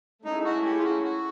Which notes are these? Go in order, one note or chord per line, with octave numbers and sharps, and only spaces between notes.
A3 C#4 D#4 E4 G#4
F#4
G4
F4
F#4
F#4